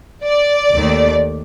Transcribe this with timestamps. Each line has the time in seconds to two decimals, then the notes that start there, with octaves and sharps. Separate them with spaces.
0.25 D5
0.74 D#2 D#3 A3